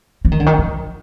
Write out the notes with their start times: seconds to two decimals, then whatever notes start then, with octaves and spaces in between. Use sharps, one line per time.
0.25 E3
0.32 D#3
0.40 D3
0.46 D#3
0.58 F3